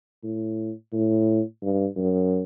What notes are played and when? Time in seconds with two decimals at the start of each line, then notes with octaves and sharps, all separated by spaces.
0.24 A2
0.93 A2
1.62 G2
1.97 F#2